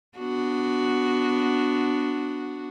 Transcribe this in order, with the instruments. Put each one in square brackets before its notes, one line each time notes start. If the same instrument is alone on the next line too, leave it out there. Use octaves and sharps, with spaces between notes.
[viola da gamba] B3 D4 F#4